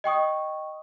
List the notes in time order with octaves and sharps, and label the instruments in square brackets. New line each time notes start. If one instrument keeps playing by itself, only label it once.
[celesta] D#5 G5 C#6 D#6